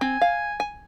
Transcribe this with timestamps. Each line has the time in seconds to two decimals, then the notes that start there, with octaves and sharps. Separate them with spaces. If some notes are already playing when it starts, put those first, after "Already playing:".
0.01 C4 G#5
0.21 F5
0.60 G#5